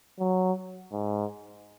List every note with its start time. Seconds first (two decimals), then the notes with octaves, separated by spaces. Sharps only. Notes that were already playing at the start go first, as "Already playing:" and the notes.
0.19 F#3
0.92 G#2